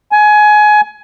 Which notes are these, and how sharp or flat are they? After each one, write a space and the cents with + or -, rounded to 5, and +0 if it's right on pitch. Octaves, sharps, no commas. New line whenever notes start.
G#5 +25